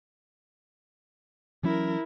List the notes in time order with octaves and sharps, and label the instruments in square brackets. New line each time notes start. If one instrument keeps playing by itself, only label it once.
[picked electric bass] E3 F#3 C#4 [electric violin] E4 A#4